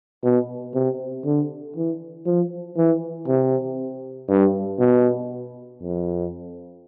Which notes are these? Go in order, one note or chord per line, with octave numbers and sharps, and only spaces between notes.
B2
C3
D3
E3
F3
E3
C3
G2
B2
F2